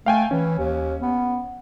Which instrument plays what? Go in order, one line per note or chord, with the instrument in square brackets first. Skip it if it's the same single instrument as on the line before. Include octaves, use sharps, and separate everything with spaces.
[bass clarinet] A3 [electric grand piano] F5 G5 G#5
[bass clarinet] E3 [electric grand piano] C#4
[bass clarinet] D#2
B3